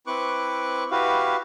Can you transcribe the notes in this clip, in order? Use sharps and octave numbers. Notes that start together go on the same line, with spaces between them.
C4 E4 B4 C#6 D6 F#6
E4 F#4 G4 B4 F5